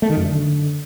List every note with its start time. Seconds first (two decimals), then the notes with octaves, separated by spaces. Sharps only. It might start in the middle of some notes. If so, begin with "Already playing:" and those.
0.02 A3
0.10 D#3
0.17 F#2
0.24 D3